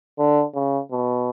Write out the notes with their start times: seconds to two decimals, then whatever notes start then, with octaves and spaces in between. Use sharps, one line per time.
0.18 D3
0.55 C#3
0.92 B2